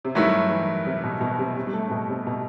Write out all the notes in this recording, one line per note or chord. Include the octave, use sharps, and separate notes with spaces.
C3
G2 D#3 F#3 A3 E4
E3
C3
B2
B2
B2
C3
C3
G3
A3
C3
B2
C3
B2